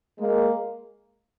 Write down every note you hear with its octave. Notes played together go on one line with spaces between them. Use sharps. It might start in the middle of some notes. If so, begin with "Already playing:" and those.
G#3 A#3